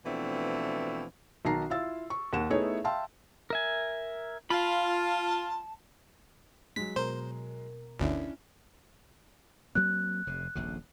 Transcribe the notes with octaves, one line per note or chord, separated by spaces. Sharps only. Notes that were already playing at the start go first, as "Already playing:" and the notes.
B2 E3 F3 A3 C4 D4
B1 D#3 A5 A#5 C7
E4 F4 F5 E6 A6
C#6
D#2 F#5 E7
A3 B3 D#4 E4 G#4 C#5
E5 F5 G5 A5 C6 E6
A#4 E5 G#5
F4 F5 A5 B5
F#3 G#3 B6
B2 A#4 C5
G1 D2 C#4 D4 E4
F#3 A#3 C4 F#6
F1 C3
D#1 A#1 C3